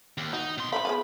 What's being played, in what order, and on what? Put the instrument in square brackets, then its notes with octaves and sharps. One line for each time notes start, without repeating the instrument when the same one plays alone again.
[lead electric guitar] D#2
[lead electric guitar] D#4 [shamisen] F#4
[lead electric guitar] B2 C6
[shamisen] F3 A#4 F5 [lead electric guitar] B5
[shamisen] G#3 B3 F4